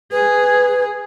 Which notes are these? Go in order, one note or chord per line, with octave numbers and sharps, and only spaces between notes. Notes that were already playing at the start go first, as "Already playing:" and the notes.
G#4 B4